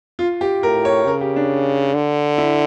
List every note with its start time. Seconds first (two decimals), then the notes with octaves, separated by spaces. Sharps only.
0.19 F4
0.41 G4
0.63 A2 A#4
0.85 C#5
1.06 C#3 A#4
1.21 G4
1.36 D4
1.94 D3
2.38 E4